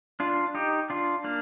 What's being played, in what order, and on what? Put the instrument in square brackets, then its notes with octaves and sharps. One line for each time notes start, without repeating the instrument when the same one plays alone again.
[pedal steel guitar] D4 F4
D#4 G4
D4 F4
A#3 D4